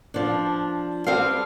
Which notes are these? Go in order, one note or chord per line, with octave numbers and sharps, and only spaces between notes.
F3 D4
G3 C4 A4 F5